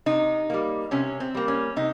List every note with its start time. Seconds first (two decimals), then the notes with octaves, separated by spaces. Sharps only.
0.06 C3 D#4
0.50 G3 A#3
0.91 C3 C#4
1.20 C4
1.35 G3 A#3
1.48 C#4
1.76 C3 D#4